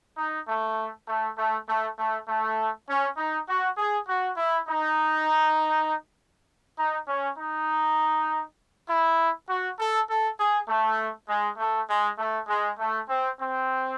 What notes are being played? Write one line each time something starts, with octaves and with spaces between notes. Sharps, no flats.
D#4
A3
A3
A3
A3
A3
A3
C#4
D#4
F#4
G#4
F#4
E4
D#4
D#4
C#4
D#4
E4
F#4
A4
A4
G#4
A3
G#3
A3
G#3
A3
G#3
A3
C4
C4